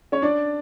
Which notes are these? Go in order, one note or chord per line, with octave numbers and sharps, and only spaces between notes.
C#4 C#5
D4 D5